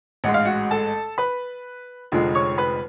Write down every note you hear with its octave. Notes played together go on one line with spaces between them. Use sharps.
A1 G#2 G#3 F#5
F5
F#4 F#5
A4 A5
B4 B5
F1 F2 D3 F3 G#3
C#5 C#6
B4 B5